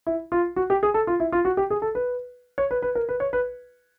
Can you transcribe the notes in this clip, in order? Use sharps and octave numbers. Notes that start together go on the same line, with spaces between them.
E4
F4
F#4
G4
G#4
A4
F4
E4
F4
F#4
G4
G#4
A4
B4
C#5
B4
B4
A#4
B4
C#5
B4